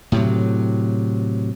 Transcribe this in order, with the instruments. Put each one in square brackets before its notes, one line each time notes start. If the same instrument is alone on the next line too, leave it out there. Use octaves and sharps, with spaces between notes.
[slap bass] A2 C3 F#3